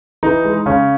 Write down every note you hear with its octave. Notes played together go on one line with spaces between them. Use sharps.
E3 D#4
G#3
C#3 C#4